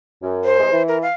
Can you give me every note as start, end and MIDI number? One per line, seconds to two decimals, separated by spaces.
0.22 0.57 42
0.45 0.83 72
0.59 0.67 48
0.59 0.67 52
0.59 0.67 56
0.72 1.03 52
0.88 0.98 70
1.02 1.15 77